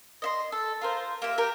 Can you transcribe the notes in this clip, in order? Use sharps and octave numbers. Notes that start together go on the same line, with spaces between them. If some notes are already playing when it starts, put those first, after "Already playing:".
D#5 E5 C6
A4
F4 A#4 C5
A#3 G4 E5
G4 A#4 G5